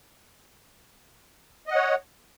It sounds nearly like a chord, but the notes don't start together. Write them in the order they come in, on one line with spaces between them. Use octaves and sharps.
D#5 F#5 C#5